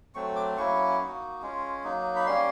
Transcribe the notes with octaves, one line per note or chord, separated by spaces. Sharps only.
F#3 A3 C4 C#6
D6
F#3 A#3 C#4 E4 C#6
A#3 D#4 F#4
G#3 C#4 F4
F#3 A#3 D#4
B5
G3 A#3 C#4 C6